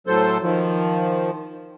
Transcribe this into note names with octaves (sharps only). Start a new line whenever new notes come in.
A2 F#3 A4 C5 G6
D#3 F3